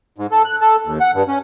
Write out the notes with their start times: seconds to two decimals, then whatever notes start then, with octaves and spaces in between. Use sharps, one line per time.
0.18 G#2
0.31 A4
0.45 F#6
0.61 A4
0.85 D#2
1.01 F#5
1.14 G2
1.28 C#4